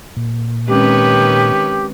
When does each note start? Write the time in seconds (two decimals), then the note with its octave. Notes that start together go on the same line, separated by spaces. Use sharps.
0.17 A#2
0.68 D#3 G#3 C4 C#4 G4 B4 C#5